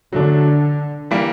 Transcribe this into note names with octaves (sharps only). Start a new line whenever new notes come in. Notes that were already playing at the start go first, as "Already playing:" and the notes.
D3 F#3 A3 D4
E3 G3 A#3